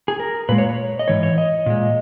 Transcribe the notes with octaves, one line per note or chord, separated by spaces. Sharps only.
G#4
A#4
A#2 G#3 B4
C#5
C#5
D#5
G#2 E3 C#5
C#5
D#5
A#2 G#3